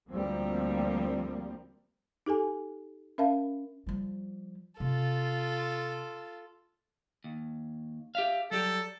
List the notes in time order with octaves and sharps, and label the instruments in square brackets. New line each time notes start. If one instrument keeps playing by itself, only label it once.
[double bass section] D2 F3 G3 A#3 C4
[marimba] D#4 G4 A4 G#5
C#4 A#4 E5 F5 A5
[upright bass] F3 G3
[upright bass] C3 [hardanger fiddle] F4 A4
[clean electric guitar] D#2
G4 E5 F5
[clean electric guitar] F#3 G3 G4 [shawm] A4